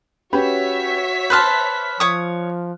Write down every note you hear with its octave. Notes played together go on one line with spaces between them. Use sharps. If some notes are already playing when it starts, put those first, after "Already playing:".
C#4 F#4 G4 B4 C#5 E5 B6
B4 C5 A5 F6 F#6
F3 C#5 D#6